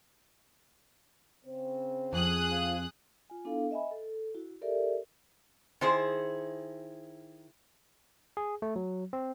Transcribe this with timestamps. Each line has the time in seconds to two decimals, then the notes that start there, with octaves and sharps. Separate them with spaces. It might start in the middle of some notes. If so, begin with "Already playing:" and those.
1.45 C#3 C4 C5
2.13 F2 G#4 D#6 F#6
2.49 C4 F4
3.30 F4 G#5
3.45 B3 D4 E4 A4 F5
3.71 D#5 E5 G#5 B5
3.91 A4
4.35 E4 F#4
4.61 G4 A4 A#4 D5 E5
5.81 D#3 E4 G#4 C5
8.37 G#4
8.62 A3
8.76 F#3
9.13 C4